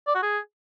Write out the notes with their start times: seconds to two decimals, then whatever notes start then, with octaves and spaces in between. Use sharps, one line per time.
0.07 D5
0.15 F#4
0.23 G#4